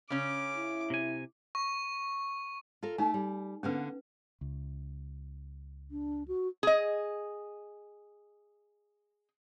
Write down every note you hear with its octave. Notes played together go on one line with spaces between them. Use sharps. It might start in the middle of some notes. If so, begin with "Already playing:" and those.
C#3 C#4 D6
E4
C3 G#5
C#6
F4 A4 A#4
A3 D#4 G#5
G3
D3 A#3 B3 C#4 B4
C#2
D4
F#4
G#4 D#5